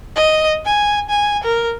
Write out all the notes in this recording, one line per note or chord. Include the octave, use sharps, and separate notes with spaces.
D#5
G#5
G#5
A#4